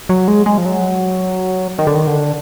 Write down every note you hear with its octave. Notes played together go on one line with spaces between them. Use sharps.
F#3
G#3
G#3
F3
F#3
D#3
D3
D#3
D3